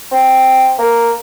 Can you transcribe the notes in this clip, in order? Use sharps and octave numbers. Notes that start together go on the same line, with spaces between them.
C4
A#3